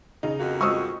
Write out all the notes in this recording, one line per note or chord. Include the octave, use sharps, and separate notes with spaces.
C#3 D#4
F2 A#3 F#4
G#3 C4 F4 C#6 D#6 E6